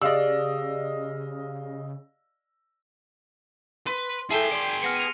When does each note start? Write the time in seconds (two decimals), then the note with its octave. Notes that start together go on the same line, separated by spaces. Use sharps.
0.02 C#3 G4 G#4 D5 D#5 F5 E6
3.87 B4 C6
4.31 E4 G#4 A4 G5 C7 E7 G7
4.51 D5 C6 D7
4.83 B3 F6 A#6 C#7
4.96 D#7 F7